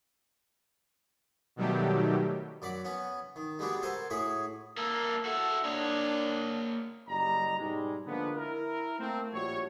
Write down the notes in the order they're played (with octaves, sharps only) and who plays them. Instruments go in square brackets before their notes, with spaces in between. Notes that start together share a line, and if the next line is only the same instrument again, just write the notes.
[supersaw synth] B2 D#3 F#3 G3 A3 G4
[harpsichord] F#2 D5 F#5 B5 D6
B3 C#4 F#5
D#3
G3 G#3 B3 D4 F#4 G4
A4 A#4 C5 F#5 G#5 A5
A2 F#4 G#4 B5 C#6
[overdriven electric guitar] A#3 A4 [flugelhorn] A#4
[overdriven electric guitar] E4 F#4 [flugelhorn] A4
[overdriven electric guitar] A#3 C#5 [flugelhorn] D4
[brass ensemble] F#1 G3 D#5 A#5
G#2 B2 G3 G#3
D3 F3 G#3 A#3 B3
E4 A#4
A3 A#3 C4
A#1 A2 G3 F#4 C#5